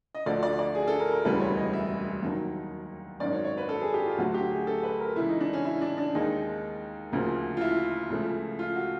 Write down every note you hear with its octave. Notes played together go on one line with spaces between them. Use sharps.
D#5
D2 D3 F3 A3 D5
D5
D5
G#4
A4
A#4
A#4
E1 D2 C#3 E3 G3 B4
C#5
D#5
E5
D#2 D#3 F#3
G#1 F#2 D#3 F#3 D5
C#5
C#5
B4
A4
G#4
G4
F4
D2 D3 F#3 A3 F#4
G4
G#4
A4
B4
A#4
C#2 C#3 E3 E4
D#4
D4
C#4
E4
D4
D4
D#2 D#3 G#3 D#4
D2 C#3 F3 A#3
F4
E4
C#2 C#3 F3 A3
F4
F#4